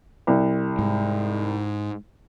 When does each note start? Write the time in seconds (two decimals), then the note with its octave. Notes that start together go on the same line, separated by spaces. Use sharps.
0.27 C2
0.79 G#2